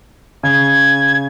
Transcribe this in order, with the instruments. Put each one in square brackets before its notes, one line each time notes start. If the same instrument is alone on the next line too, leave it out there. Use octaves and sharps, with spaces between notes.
[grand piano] C#3 [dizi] G#6